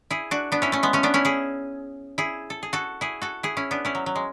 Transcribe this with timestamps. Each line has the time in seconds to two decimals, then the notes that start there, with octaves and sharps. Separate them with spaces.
0.10 E4 G#4
0.31 D4 F#4
0.52 B3 D4
0.62 C#4 E4
0.72 A3 C#4
0.83 G#3 B3
0.93 A3 C#4
1.03 B3 D4
1.14 C#4 E4
1.25 E4 G#4
2.18 E4 G#4
2.50 A4
2.63 G#4
2.73 F#4 A4
3.01 E4 G#4
3.22 F#4 A4
3.43 E4 G#4
3.57 C#4 E4
3.71 B3 D4
3.85 C#4 E4
3.95 F#3
4.06 F#3
4.16 G#3